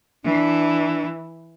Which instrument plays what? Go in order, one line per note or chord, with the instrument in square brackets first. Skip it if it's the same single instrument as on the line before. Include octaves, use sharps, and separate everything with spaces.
[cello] E3 [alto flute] D4